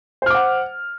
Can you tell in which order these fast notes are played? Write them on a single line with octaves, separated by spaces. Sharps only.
C5 F6 D6 F#5